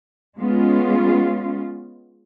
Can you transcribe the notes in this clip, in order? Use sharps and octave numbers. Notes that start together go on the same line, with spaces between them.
G#3 B3 C#4 F4